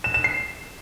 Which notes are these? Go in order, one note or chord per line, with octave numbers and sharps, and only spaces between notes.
E7
E7
C7